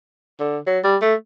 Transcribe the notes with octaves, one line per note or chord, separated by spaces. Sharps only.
D3
F#3
G3
A3